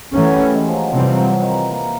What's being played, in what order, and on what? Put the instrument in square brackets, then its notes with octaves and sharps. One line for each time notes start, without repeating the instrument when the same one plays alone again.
[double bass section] E3 A3 C#4 [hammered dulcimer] F#3
[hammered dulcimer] G3
G#3
F3
F#3
[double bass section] C3 E3 G3 C4 [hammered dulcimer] F3
[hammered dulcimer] F#3
F3
D#3
E3
A#3